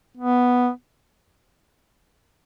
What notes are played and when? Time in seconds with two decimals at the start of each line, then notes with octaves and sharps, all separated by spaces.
0.18 B3